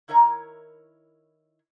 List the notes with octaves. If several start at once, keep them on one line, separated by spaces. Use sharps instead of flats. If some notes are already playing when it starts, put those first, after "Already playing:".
D#3 E4 A#4 C#5 D#5 A#5